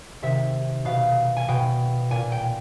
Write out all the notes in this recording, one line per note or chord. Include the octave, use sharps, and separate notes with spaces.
C3 D#3 E5
B2 F5
G#5
B2 G5
A#2 G#5
G5